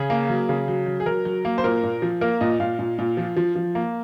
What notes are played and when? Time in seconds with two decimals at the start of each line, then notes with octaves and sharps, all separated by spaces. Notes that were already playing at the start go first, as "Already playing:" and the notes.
Already playing: C#3 G#4
0.10 A#3
0.29 F#3
0.49 C#3
0.68 F#3
0.86 F#3
1.00 G#4
1.06 F#3 A#4
1.25 F#3
1.45 A#3
1.58 C5
1.64 A#2 A#4
1.83 A#2
2.02 F3
2.21 A#3 A#4
2.41 A#2 D#5
2.60 A#2 F5
2.79 A#2
2.99 A#2
3.17 F3
3.36 F3
3.55 F3
3.75 A#3